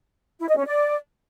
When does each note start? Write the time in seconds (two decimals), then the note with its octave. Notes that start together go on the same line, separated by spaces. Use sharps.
0.39 E4
0.48 D#5
0.57 C#4
0.66 D5